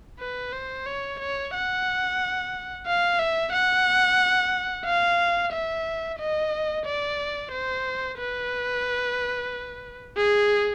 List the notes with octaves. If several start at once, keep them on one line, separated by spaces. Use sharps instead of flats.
B4
C5
C#5
C#5
F#5
F5
E5
F#5
F5
E5
D#5
D5
C5
B4
G#4